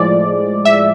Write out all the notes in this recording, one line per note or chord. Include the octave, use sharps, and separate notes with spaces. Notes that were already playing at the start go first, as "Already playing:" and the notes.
Already playing: A2 F3 G#3 D5
E5